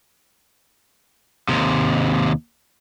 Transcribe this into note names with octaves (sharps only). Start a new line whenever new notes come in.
D#2 C3